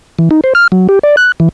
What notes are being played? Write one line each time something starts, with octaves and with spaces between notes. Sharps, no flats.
E3
D#4
C5
F6
F#3
G4
D5
F#6
E3